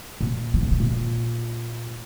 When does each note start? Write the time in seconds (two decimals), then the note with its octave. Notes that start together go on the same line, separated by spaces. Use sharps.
0.21 A#2
0.54 E3
0.62 D3
0.71 C3
0.80 A#2